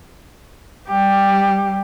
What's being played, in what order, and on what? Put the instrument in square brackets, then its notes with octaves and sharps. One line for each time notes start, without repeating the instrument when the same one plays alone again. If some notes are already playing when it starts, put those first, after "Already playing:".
[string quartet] G3 G4